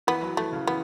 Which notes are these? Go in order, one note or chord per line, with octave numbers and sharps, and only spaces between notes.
E3 B3
F#3
E3 A3
C#3
E3 B3